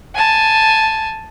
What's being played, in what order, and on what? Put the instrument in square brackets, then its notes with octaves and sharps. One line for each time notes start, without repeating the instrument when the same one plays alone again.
[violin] G#5 A5